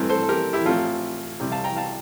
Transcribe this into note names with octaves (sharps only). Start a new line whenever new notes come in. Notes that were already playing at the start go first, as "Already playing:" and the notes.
Already playing: A1 G2 E3 A3 C4
A4 C5
A4
G4 A#4
E4 G4
A1 A2 F3 C4 F4 A4
C2 C3 G3 C4
F5 A5
G5 A#5
F5 A5